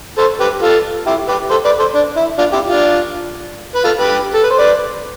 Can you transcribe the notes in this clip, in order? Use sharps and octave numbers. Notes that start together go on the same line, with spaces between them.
A4 C5
G4 B4
F4 A4
E4 G4
G4 B4
A4 C5
B4 D5
A4 C5
D4
E4
D4 F4
E4 G4
D4 F4
B4
F4 A4
G4 B4
A4
B4
C5
B4 D5